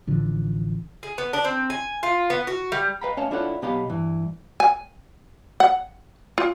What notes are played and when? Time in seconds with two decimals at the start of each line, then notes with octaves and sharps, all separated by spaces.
0.07 A1 D3 F3
1.03 G#4
1.18 B3
1.33 D4
1.45 C4
1.70 G#5
2.03 F4
2.30 B3
2.47 F#4
2.72 G3
3.01 B4 D#5 F5 G5 A#5 B5
3.17 A3 C#4 C#5 D#5 F5 A5
3.31 D4 E4 F4 A4 C#5 F#5
3.62 B1 B3 G4 D#5 F5 B5
3.90 G2 E3
4.60 G#5
5.60 F#5
6.38 F4